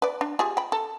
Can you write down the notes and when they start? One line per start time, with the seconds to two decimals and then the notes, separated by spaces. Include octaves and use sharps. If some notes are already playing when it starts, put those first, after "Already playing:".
0.02 B4 D5
0.21 D4
0.39 F4 G4 G#4
0.57 G5 B5
0.72 A4